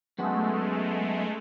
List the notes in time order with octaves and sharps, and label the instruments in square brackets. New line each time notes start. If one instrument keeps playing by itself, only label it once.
[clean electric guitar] F#2 B3 F#4 [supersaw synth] G#3 A3